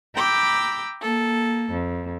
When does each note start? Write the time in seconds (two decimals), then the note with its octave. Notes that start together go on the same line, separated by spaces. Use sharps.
0.14 G5 A#5 B5 D6 E6 G6
1.01 A#3 A4
1.72 F2